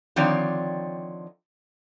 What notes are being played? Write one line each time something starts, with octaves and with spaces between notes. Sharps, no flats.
D3 D#3 F3 C4 C#5 D5